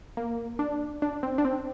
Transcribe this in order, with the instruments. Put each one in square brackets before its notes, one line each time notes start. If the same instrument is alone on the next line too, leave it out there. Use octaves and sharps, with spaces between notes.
[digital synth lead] A#3
D4
D4
C4
D4
C4